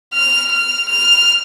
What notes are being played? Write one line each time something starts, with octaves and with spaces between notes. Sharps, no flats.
F6
F6
F6